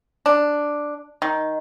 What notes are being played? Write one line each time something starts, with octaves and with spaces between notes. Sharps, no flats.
D4
D#3